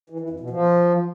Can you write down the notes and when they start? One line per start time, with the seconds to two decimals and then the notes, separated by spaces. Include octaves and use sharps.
0.10 E3
0.20 E3
0.30 F2
0.40 B2
0.50 F3